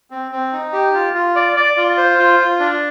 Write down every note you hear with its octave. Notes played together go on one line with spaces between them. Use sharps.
C4
C4
D#4
G4
F4
F4
D5
D5
F4
C5
F4
F4
D4